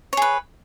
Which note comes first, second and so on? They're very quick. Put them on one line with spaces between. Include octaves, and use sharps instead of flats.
C#5 G#4 B4